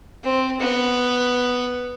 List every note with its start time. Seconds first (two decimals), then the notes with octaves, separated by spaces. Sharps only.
0.24 C4
0.61 B3